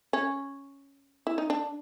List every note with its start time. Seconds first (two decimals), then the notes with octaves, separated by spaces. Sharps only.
0.13 C#4
1.27 E4
1.38 D#4
1.50 D4